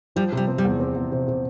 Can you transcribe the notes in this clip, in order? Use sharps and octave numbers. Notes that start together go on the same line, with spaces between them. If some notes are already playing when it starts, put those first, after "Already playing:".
F3 G3
C3
G3
C4
G3
E2
C4
E2
C3
C3